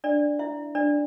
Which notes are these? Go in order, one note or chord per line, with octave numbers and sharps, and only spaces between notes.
D4 D5
E4 E5
D4 D5